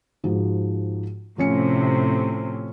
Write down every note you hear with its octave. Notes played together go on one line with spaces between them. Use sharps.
G#2 F3 F#4
A2 C3 F3 C#4 C#7